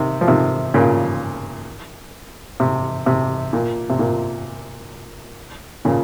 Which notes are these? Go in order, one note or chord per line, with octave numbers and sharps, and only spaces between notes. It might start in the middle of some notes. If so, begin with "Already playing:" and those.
Already playing: C3 D#3
F3
C3 D#3
A#2 C#3
C3
C3
A#2
C3
A#2
A#2 C#3